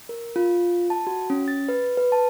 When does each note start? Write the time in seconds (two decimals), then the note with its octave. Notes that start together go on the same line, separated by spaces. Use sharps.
0.09 A#4
0.36 F4
0.90 A5
1.07 F#4
1.30 C#4
1.48 A6
1.69 B4
1.97 B4
2.12 A5